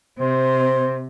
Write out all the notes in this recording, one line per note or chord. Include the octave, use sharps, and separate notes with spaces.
C3 C5